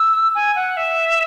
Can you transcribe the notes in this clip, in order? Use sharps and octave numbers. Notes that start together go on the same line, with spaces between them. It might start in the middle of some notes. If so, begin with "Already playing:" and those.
Already playing: E6
G#5
F#5
E5